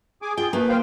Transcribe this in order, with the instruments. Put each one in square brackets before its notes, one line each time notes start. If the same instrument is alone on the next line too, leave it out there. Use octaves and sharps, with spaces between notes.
[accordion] G#4 G#5 D6
[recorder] F4 [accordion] G#4 [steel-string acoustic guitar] G5
[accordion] A3 [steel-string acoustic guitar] A#3 [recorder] B4
[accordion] C5 F5 G5